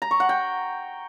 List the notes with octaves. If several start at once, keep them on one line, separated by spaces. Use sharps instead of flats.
A#5
C#6
F#5
G5